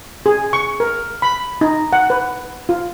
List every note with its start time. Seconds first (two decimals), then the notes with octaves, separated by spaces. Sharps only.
0.26 G#4
0.53 C#6
0.80 A#4
1.22 B5
1.61 D#4
1.93 F#5
2.10 B4
2.69 F4